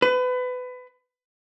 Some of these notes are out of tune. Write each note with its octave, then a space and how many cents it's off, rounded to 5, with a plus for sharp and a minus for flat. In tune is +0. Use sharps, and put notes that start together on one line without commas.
B4 +25